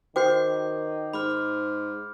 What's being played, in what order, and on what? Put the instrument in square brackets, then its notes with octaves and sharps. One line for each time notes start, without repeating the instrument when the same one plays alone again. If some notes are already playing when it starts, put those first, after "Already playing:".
[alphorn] D#3 [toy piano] F#4 C5 G5 [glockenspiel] D6 G6 C7
[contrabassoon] G#2 [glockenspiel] B5 D6 F6